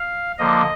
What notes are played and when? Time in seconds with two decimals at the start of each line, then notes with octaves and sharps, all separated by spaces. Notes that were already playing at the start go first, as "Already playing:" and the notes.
Already playing: F5
0.38 D3 F3 A#3 D#5